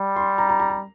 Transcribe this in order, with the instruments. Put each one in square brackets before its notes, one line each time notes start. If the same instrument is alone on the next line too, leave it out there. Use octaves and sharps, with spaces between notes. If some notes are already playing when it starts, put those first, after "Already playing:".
Already playing: [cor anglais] G3
[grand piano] C6
A#5
A#5
A#5
A#5